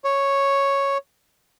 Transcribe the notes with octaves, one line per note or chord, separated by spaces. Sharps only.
C#5